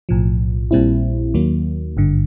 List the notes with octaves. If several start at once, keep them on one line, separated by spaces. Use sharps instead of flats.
B1 A2 F3
A#1 A#2 G3 C4 E4
D#2 D#3 F#3 A#3
G#1 G2 D3